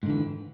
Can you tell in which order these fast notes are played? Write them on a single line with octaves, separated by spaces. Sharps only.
G#2 D3 E3